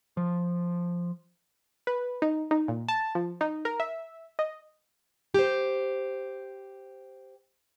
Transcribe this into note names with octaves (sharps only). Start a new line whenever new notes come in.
F3
B4
D#4
D#4
A#2
A5
F3
D#4
A#4
E5
D#5
G4 C5